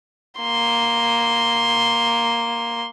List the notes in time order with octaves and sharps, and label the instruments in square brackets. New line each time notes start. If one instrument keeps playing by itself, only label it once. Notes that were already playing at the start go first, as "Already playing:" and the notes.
[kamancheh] A#3 C6